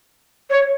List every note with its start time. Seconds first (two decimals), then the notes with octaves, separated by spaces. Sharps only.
0.50 C#5